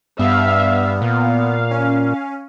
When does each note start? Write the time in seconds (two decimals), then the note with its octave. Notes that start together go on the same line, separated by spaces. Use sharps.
0.19 G2 B3 E5 F5
1.02 A#2 F5
1.71 C#4